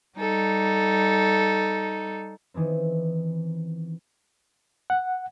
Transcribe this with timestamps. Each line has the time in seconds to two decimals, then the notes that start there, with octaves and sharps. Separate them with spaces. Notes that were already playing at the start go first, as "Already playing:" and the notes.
0.19 G3 D#4 A4
2.54 D#3 E3 B3 C4
4.90 F#5